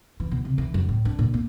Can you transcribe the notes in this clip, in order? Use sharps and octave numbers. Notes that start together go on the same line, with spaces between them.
E3
B2
C3
E3
F#2
A2
D4
A#2
A#3